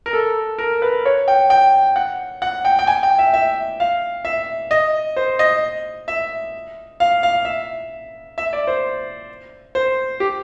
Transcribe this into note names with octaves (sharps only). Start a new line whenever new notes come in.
A#4
A4
A#4
B4
C#5
G5
G5
F#5
F#5
G5
G5
G#5
G5
E5
E5
F5
E5
D#5
C5
D#5
E5
F5
F5
E5
E5
D5
C5
C5
G4